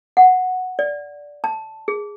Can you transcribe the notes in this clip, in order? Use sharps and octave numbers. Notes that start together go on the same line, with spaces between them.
F#5
D5
A5
G#4